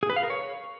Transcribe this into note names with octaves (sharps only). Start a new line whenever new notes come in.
G#4
B4
F5
A#4
C#5